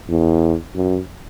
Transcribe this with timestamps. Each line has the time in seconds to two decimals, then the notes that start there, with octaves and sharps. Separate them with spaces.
0.09 E2
0.76 F#2